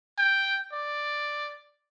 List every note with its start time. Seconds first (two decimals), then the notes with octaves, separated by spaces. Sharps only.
0.18 G5
0.72 D5